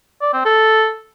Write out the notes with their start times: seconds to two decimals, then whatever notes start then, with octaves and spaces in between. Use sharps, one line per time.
0.21 D5
0.33 C4
0.45 A4